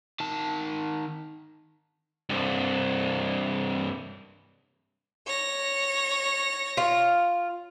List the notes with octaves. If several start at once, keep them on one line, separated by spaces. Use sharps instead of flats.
D#3 A5
C2 G2
C#5 A#6
F4